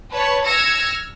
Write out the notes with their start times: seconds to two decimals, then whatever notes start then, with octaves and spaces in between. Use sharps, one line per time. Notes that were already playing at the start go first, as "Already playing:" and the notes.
0.13 B4 C#5 A5
0.45 E6 F6 G#6 A#6 C#7